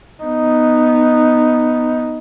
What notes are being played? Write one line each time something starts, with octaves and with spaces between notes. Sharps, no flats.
B3 D#4